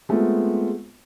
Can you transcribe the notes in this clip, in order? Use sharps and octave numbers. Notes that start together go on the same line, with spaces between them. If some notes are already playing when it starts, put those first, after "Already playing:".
G#3 A3 B3 C4 F4